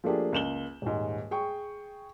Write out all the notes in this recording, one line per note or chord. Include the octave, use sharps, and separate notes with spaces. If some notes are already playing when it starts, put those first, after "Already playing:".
F3 A3 A#3 D4 G4 G#4
C#2 A#3 E7 F#7 G7
D#1 G#2
G#4 G5 C#6